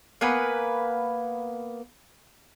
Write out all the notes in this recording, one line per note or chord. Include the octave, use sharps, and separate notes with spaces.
A#3 B3 B4 G#5